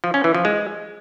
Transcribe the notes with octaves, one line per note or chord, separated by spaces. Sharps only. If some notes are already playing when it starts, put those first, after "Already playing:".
F3
C#4
E3
F3
G#3